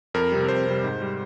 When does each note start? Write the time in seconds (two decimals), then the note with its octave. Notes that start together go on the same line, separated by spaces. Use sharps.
0.14 F2 A#4
0.32 C3 G3
0.49 F2 C5
0.67 C3 G3
0.84 G#2
1.02 G3